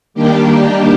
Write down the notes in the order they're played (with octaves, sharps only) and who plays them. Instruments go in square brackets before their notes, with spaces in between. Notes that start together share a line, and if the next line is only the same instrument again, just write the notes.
[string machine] D#3 G3 A#3 D4 G4